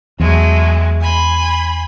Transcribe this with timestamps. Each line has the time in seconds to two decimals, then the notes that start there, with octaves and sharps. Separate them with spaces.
0.20 E2 F#3 G#3 A3
1.00 G#5 B5 C6